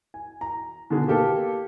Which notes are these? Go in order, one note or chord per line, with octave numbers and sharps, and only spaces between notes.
G#5
A#5
B2 D3 D#3 G#4
A#3 G4 A4 B4